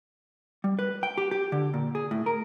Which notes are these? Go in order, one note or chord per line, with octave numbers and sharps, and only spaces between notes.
G3
B4
G5
G4
G4
D3
A#2
G#4
A2
A#4